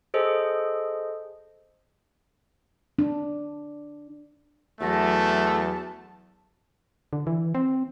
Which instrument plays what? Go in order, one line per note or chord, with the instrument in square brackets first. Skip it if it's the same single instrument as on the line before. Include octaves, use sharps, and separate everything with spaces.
[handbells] G#4 A4 C5 D#5
[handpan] D4
[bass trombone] E2 [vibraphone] F#3 F#4 [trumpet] A3 [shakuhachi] A5
[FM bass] D3
E3
C4